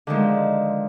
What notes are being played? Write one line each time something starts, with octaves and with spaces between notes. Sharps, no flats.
D3 D#3 F3 G#3